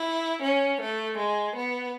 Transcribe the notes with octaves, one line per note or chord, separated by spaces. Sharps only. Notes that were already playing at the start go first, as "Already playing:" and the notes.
Already playing: E4
C#4
A3
G#3
B3